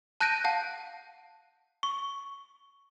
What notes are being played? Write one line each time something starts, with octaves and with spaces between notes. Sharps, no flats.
A5 F#6 G6 A#6 D7 D#7
F5 F#5 A5
C#6